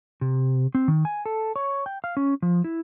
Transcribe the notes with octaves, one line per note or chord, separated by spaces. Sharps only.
C3
C4
D#3
G#5
A4
C#5
G5
F5
C#4
F3
E4